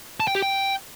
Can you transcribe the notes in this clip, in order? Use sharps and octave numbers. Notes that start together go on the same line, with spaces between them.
A5
G5
G4
G5